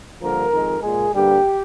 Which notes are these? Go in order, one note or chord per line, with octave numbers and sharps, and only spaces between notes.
G2 D3 F3 A#3 A#4
F2 D#3 G#3
A#2 G#3 G#4
G2 D3 G3 A#3 G4